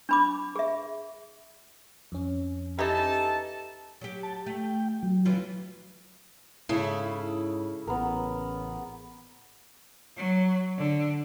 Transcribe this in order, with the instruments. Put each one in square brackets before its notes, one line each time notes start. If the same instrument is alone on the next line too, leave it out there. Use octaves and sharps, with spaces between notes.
[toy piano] D4 B5 D6
G#4 E5
[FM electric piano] F2 C#4
[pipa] E3 D#4 [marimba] G4 [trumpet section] A4 A5
[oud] F#3 G4
[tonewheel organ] A5
[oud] A3 [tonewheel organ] G5
[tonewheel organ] F#3
[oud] E3 C#4 F4
[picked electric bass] G#2 [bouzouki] C#3 [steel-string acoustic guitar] E4 A4
[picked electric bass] A1 [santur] B3 A#4
[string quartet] F#3
D3